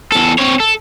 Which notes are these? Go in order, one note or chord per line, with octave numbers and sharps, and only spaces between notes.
E2 A4
C4 C#5
A4